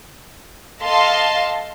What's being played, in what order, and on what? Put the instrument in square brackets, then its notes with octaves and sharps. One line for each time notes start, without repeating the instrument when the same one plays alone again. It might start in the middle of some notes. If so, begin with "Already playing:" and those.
[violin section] A4 D#5 F5 A5 C6